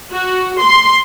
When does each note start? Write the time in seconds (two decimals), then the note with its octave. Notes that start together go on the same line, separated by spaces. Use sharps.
0.12 F#4
0.62 C6